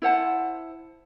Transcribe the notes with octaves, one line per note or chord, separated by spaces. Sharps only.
E4 C5 F#5 A5